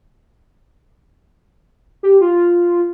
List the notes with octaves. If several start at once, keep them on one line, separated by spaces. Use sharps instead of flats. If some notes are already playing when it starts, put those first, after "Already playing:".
G4
F4